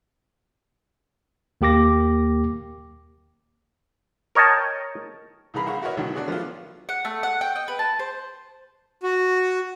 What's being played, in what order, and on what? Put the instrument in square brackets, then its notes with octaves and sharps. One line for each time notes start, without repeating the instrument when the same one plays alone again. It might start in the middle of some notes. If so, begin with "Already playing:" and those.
[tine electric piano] D#2 A#3 G4 D6 A#6
[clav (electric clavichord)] A#4 C#5 D#5 G5 A5
[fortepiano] C2 C#3 E3 G#4 A#5 B5
A#1 F5 F#5 C#6
E4 F#4 A#4 B4 C#5 D#5
C#2 B2 D3 E3 F#3
D4 F#4 G#4
F3 F#3 A3 B3 D4 F4
[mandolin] F#5
A3
F#5
G5
D#5
B4
A5
C5
[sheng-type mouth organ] F#4